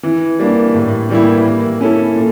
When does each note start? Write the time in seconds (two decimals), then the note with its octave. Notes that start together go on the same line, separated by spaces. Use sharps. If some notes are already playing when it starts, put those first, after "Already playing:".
0.03 E3
0.39 G3 A#3 D4
0.74 A2
1.09 E3 G3 A#3 E4
1.45 A#3
1.81 C#4 E4 A4
2.16 A#2